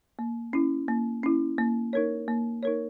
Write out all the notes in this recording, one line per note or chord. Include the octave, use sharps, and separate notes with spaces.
A#3
C#4 E4
A#3
C#4 E4
A#3
D#4 A#4 C#5
A#3
D#4 A#4 C#5